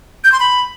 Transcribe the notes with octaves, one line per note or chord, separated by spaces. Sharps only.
G6
C6
B5